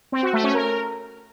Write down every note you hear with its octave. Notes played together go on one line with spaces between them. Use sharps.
C4
F#4
A3
C#4
A#4